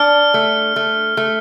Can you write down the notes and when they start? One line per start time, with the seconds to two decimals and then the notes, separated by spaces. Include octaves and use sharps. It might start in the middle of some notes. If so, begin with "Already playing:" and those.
Already playing: D4 F6
0.34 A3
0.76 A3
1.17 A3